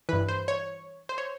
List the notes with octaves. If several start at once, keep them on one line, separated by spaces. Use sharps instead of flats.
G2 E3 B4
C5
C#5
C5
C#5